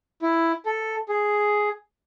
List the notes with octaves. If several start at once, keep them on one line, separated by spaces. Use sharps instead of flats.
E4
A4
G#4